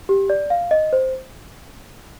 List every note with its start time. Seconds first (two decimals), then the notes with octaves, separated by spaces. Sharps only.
0.09 G4
0.30 D5
0.50 F5
0.71 D#5
0.93 C5